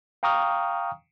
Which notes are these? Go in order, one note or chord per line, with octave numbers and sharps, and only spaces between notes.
F5 G5 A#5 C#6 D#6 F6